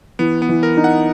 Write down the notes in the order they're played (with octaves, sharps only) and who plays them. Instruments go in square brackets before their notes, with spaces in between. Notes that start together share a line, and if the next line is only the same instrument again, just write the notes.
[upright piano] E3 [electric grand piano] B3
[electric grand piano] B3
[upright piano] E3
[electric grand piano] A#4
[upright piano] D#4
[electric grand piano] F#5